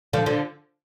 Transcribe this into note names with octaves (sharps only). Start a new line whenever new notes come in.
D3 F3
D3 F3